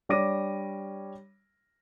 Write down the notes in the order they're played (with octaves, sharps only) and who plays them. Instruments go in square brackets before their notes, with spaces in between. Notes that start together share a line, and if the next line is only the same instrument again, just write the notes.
[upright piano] G3 D4 C#5 D6 A#6 D#7